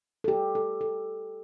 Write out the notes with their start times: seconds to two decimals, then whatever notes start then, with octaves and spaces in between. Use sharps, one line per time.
0.24 A4
0.28 G4
0.55 A4
0.81 A4